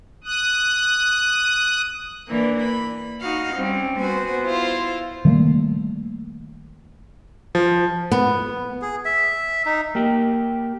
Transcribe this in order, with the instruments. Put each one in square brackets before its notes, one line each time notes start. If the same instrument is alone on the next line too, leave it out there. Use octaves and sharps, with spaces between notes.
[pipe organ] D#6 F#6
[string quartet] E3 A#3 B3 D4
B5
D#4 F#4 F5
G3 C4 C#4
B3 F#4 C5 G#5
E4 F4 C5
[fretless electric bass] D#3 G3 A3 A#3
[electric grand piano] F3
[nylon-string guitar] B3
[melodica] G#4
E5
D#4
[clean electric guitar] A#3 G4